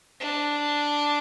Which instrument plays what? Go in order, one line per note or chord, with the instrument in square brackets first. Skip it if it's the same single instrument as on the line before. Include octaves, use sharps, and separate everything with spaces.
[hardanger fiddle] D4